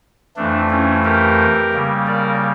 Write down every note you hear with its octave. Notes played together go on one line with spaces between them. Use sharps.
F2 E3 A3 D4
C#4 E4
G4 A#4
C#3 G3 A#3
A#4 D5